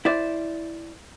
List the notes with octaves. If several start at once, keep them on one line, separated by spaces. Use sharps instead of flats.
E4 C5 D5